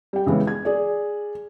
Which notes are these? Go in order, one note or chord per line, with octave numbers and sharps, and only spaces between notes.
G3 G5
C#3 E3 G#3 B3 C#4
G#6
G#4 D5